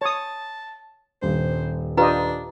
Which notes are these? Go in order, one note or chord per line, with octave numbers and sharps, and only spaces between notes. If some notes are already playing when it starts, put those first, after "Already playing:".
C#5 A5 D#6
D#1 G2 C5
D4 F4 G4 B4 D#5 A#5